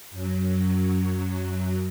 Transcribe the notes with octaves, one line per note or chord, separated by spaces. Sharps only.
F#2 F#3